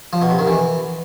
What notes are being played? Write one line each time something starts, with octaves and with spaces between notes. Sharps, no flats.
F3
B2
C3
D#3
E3